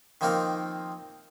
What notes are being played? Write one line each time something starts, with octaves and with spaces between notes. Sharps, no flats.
D#3 F3 A#3 C4 D#4 A#4